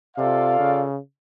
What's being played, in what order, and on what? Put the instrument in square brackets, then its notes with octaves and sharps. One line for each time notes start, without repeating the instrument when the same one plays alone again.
[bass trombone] C3 [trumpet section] F4 A4 D5 F5
[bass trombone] C#3